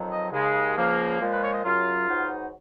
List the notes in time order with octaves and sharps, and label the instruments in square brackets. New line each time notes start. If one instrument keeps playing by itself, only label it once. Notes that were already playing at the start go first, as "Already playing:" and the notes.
Already playing: [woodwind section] F2 D#3 F#3
D#5
D#2 C#3 G#3
C#2 C#3 F3 A#3
A#2 F3 G#3
B4
C#5
D#5
F#2 C#3 F#3 F4
G#2 F#3 B3 D#4